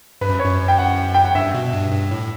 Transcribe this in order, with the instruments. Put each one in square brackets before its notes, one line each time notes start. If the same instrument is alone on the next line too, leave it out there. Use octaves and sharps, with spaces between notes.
[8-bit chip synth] G2 [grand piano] B4
[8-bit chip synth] F#2
[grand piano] C#5
[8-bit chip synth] F#2
[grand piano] G5
F#5
G5
F#5
[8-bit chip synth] G2 [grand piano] E5
[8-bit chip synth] B2
G2
G2
A2